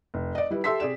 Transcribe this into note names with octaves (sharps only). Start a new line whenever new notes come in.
F1
D5 D#5
G3 E4 B4
G4 A4 E5 C6 E6 B6
C3 G#4 D5 E7